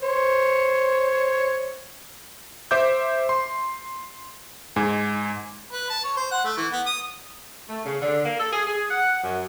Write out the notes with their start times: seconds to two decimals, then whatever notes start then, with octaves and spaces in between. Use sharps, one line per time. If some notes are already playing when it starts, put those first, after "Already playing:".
0.02 C5 C#5
2.71 C5 E5 D6 G6
3.29 C6
4.76 G#2 G#5
5.72 B4
5.90 A5
6.04 C#5
6.16 C5
6.31 F#5
6.45 A3
6.57 E3
6.72 B3
6.86 D#6
7.69 A3
7.86 C#3
8.02 D3
8.25 A#3
8.40 A4
8.53 G#4
8.67 G#4
8.91 F#5
9.23 F#2